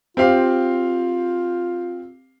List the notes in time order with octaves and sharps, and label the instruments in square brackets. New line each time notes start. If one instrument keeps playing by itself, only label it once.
[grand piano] C4 G4 F5 [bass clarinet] F4